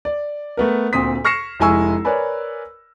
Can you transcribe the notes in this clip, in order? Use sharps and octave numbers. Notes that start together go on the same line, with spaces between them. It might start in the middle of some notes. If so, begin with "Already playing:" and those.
D5
A3 B3 A#4
D2 A#2 C4 C6 D#6 B6
C#6 F6 A#6 C7 C#7 E7
F1 G#3 E4 G#5 C#6 E6
A#4 B4 C#5 D5 G#5 B5